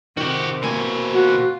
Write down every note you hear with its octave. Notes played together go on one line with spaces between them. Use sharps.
C3 D#3 F#4 G4
B2 A#3 C4 G#5
F4 F#4